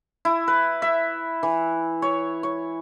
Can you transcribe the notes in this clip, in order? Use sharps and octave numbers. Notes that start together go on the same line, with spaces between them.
E4
B4
E5
E3
C#5
C#5